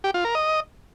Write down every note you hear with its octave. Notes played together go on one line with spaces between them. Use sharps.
G4
F4
A#4
D#5